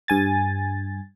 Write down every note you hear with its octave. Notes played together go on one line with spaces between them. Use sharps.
G2 G#5 A6